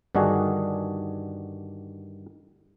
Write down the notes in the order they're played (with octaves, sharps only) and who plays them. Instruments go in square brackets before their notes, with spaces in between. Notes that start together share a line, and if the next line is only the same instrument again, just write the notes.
[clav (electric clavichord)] G2 D3 D#3 D4 F#4 G#4